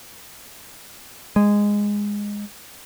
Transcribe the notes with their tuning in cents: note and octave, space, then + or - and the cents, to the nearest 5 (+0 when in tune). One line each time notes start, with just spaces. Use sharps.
G#3 -10